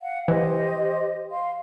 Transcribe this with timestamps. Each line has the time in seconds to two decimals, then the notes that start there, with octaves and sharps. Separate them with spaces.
0.01 F5 F#5
0.28 E3 G4 C5 D#5
1.32 F5 C6